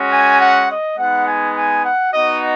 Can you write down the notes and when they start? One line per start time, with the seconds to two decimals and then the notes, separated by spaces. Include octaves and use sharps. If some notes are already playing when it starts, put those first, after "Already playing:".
Already playing: G#3 C#4 F#4
0.11 G#5
0.40 F#5
0.69 D#5
0.98 G#3 B3 D#4 F#5
1.27 G#5
1.55 G#5
1.84 F#5
2.13 B3 D#4 F#4 D#5